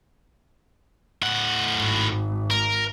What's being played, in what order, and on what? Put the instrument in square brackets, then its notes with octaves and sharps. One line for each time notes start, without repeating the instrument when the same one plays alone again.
[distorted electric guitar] A2 F#5
[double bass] G#1 G#2
[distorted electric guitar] A#4